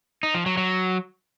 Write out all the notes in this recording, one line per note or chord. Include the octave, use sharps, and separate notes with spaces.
D#4
F3
F#3
F#3